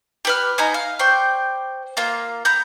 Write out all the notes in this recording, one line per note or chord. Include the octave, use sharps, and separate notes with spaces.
G4 B4 F6
B3 D#4 G#5 A#5
F5
C5 D5 G5 C#6
A#3 F4
B3 A#5 G6